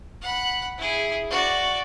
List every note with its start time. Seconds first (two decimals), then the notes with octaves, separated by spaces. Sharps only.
0.22 F#5 B5
0.78 E4 G#4
1.30 F#4 D5